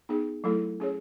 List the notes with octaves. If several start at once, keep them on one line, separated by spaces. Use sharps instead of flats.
B3 D#4 G#4
F#3 A3 E4 A4
C#4 G#4 C#5